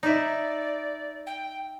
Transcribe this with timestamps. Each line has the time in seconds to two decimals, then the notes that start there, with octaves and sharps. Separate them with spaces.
0.03 D#4 E4 D5
1.27 G5